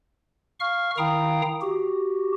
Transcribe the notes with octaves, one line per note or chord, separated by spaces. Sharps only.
F5 C#6 F6
D#3 E4 F5 G5 A#5 D#6
F#4 G4